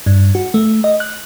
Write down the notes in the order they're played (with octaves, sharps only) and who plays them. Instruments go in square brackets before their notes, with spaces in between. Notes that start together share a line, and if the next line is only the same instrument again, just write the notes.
[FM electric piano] G2
F#4
A3
D#5
F#6